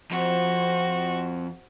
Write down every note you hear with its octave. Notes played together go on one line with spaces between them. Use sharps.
F2 F#4 C5